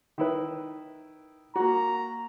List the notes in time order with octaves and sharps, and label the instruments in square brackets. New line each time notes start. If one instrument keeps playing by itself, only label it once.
[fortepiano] D#3 E4 B4
[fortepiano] A#3 F#4 [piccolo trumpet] A#5